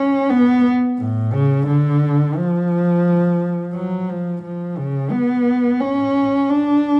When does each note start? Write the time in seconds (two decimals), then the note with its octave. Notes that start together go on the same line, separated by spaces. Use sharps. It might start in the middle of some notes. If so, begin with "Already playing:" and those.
Already playing: C#4
0.30 B3
0.99 A2
1.33 C#3
1.67 D3
2.36 F3
3.74 F#3
4.09 F3
4.43 F3
4.77 C#3
5.11 B3
5.80 C#4
6.49 D4